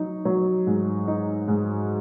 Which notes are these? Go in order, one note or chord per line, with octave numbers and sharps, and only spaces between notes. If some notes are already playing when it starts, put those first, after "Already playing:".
Already playing: F#3 D#4
F#3
G#2
D#4
G#2